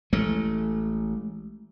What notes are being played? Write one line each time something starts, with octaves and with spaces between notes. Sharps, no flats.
A1 G#3 A3